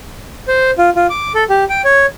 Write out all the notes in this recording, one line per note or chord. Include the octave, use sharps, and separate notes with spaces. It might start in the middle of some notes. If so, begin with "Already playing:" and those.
C5
F4
F4
D6
A4
G4
G5
C#5